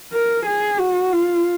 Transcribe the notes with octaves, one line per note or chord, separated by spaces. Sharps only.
A#4
G#4
F#4
F4